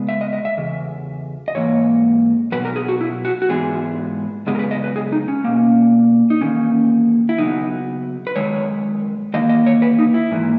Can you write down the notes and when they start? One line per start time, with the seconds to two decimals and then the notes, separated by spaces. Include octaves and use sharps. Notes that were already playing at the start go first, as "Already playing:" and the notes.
Already playing: C#3 G#3 B3
0.09 E5
0.21 D#5
0.33 D#5
0.45 E5
0.58 E2 C#3
1.48 D#5
1.55 G#2 E3 A#3 C#5
2.52 B2 F#3 B3 B4
2.65 A#4
2.76 G#4
2.89 F#4
3.01 E4
3.25 F#4
3.42 F#4
3.49 G#2 E3 G#3 B3 G#4
4.47 F#2 C#3 G#3 B3 G#4
4.55 A#4
4.59 B4
4.71 D#5
4.84 B4
4.96 G#4
5.12 D#4
5.28 C#4
5.44 B2 A#3
6.30 D#4
6.41 E2 D#3 A#3 C#4
7.29 E4
7.38 C#3 F#3 B3 D#4
8.27 B4
8.36 F#2 D#3 G#3 C#5
9.34 E2 D#3 A#3 D#5
9.49 D#5
9.66 C#5
9.82 B4
9.99 D#4
10.14 E4
10.31 G#2 E3 A#3